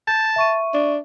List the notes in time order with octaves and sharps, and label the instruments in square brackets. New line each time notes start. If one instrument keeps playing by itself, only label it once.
[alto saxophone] A5 [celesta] G6
[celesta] E5 C#6 D#7
[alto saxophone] D4